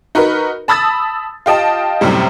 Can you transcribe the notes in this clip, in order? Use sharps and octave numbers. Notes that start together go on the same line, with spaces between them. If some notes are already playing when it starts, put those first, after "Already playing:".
D#4 F#4 A#4 B4
A5 B5 D#6 E6 A6
F4 G4 D#5 A5
F#2 A2 C3 G3